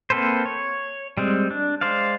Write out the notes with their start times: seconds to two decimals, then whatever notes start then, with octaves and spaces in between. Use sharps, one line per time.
0.10 A#3 C4 A4 B4 C5
0.46 C#5
1.17 G3 G#3 C4
1.51 D4
1.81 G#3 C5 D5 F5